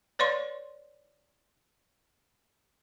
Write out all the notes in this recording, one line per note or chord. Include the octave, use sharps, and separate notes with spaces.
B4 C#5 D5 F5 C6 C#6